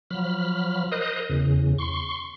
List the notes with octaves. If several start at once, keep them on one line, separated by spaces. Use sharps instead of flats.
F3 F#3 B5 F6
A#4 C5 D#5 D#6 F#6
E2 C#3
C6 C#6